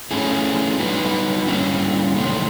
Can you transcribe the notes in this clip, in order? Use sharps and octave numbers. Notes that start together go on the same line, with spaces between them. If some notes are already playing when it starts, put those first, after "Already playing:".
A3 C#4 E4 G#4
G3 B3 D#4 F#4 B4
G3 A#3 C#4 E4
C3 D#3 F#3 A3 C4